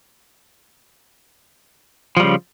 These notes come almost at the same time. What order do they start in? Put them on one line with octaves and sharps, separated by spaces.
F3 G3 C#3